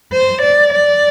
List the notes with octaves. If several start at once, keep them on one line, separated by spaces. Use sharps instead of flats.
C5
D5
D5